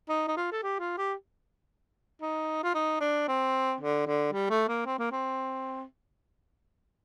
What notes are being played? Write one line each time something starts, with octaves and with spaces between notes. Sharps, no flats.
D#4
D#4
F4
A4
G4
F4
G4
D#4
F4
D#4
D4
C4
D3
D3
G3
A3
A#3
C4
A#3
C4